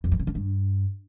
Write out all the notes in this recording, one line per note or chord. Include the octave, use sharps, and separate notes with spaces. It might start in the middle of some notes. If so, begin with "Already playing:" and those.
F2
E3
C#3
D3
G2